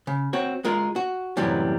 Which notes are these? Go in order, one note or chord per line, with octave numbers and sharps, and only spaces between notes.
C#3
C4 F#4 C#5
G#3 F4 A#4
F#4
F#2 A2 C3 E3 G3